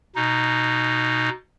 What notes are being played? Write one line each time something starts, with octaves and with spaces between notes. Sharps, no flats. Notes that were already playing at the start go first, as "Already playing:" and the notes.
B2 D#4